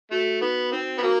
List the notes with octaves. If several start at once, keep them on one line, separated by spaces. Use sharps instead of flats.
A3 F#4
B3 D#4
C4 D#4
B3
A#3 F#4